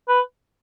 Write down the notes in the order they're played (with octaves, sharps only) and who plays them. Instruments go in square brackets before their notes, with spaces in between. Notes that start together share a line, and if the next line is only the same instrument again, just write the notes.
[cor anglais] B4